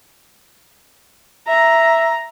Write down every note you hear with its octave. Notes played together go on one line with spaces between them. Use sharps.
E5 A#5